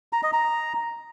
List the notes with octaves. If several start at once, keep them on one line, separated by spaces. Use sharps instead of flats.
A#5
D#5
A#5